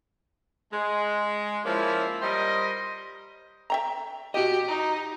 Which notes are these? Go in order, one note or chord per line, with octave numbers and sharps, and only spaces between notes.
G#3
F3 A#3 C#4 E4
G3 A#4 C5 D#5
E5 G5 A#5
F#4 G4 D#5
D#4